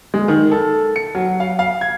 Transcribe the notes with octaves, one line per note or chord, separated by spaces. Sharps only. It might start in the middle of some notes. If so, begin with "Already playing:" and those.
G#3
D#3
A4
C#7
F#3
F5
F5
G#6